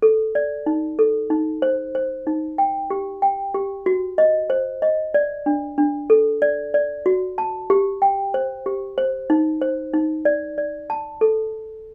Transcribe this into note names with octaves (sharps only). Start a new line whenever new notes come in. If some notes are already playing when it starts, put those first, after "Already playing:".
A4
D5
D#4
A4
D#4
C5
C5
D#4
G5
G4
G5
G4
F#4
D#5
C5
D#5
D5
D4
D4
A4
D5
D5
F#4
A5
G4
G5
C5
G4
C5
D#4
C5
D#4
D5
D5
A5
A4